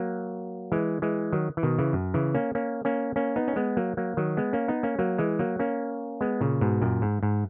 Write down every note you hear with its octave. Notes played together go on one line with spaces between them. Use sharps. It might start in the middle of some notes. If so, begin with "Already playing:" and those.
Already playing: F#3 A#3
E3 G#3
E3 G#3
D#3 F#3
E3
B2 D#3
C#3 E3
F#2
C#3 E3
A#3 C#4
A#3 C#4
A#3 C#4
A#3 C#4
B3 D#4
C#4
G#3 B3
F#3 A#3
F#3 A#3
D#3 F#3
G#3 B3
A#3 C#4
B3 D#4
A#3 C#4
F#3 A#3
E3 G#3
F#3 A#3
A#3 C#4
G#3 B3
A#2 C#3
G#2 B2
F#2 A#2
G#2
G#2